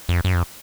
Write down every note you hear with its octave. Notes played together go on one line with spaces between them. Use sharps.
F2
F#2
F2